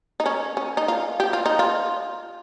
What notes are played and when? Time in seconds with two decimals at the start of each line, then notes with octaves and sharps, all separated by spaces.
0.20 D#4
0.26 C#4
0.57 C#4
0.77 D#4
0.88 F4
1.20 G4
1.33 F4
1.46 D#4
1.59 F4